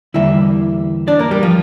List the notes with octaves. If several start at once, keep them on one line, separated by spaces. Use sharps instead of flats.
E2 D3 G3 A#3 E4 E5
D4 D5
A#3 A#4
G3 G4
F3 F4